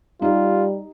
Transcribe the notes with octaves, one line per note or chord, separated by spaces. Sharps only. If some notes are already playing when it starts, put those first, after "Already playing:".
G3 D#4 F4 G4